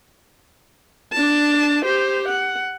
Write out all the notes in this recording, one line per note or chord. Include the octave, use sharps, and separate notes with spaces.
D4 A5
G4 C5
F#5